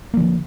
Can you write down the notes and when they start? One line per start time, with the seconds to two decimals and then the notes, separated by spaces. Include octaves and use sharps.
0.14 A#3
0.17 F3
0.20 D3